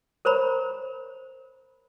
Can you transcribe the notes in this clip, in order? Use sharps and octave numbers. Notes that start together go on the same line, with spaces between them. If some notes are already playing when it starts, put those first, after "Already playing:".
A#4 C5 C#5 A#5 B5